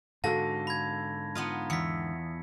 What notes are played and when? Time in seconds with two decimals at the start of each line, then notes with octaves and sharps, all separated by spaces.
0.24 G#2 D3 F#4 A4 F5 A5 A#6
0.67 B5 G#6
1.35 B3 D#4 F4
1.70 E2 B6 C#7